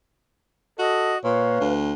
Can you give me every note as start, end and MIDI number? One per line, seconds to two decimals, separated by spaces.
0.79 1.18 66
0.79 1.15 69
0.79 1.18 75
1.24 1.60 46
1.24 1.75 71
1.24 1.67 73
1.24 1.71 77
1.61 1.94 38